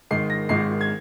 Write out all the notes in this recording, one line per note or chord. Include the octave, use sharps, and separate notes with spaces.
G#1 G#2 D#3 C7
A#6
G#1 G#2 D#3 C7
G#6